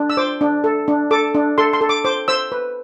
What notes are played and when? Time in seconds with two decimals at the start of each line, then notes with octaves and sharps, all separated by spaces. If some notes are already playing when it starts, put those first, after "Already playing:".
Already playing: D4
0.10 E6
0.17 C5 D6
0.41 D4
0.64 A4
0.88 D4
1.11 A4 D6
1.34 D4
1.58 A4 C6
1.73 C6
1.81 A4
1.89 D6
2.05 C5 D6
2.28 C5 E6
2.52 B4